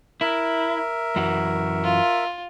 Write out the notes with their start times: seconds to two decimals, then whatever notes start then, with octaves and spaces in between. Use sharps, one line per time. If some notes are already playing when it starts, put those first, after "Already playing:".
0.21 E4 A#4 E5
1.16 F#2 E3 F#4
1.83 F4